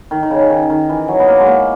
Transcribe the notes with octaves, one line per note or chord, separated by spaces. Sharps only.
D#3
D#3
C#3
C#3
D#3
D#3
E3
F#3
B3
A#3
G#3
A#3